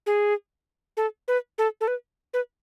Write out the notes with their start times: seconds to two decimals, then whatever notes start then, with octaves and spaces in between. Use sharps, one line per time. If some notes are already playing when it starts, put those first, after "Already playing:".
0.06 G#4
0.97 A4
1.28 B4
1.58 A4
1.81 A4
1.88 B4
2.34 B4